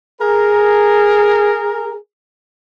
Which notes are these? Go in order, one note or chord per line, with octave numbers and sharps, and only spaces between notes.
G#4 A#4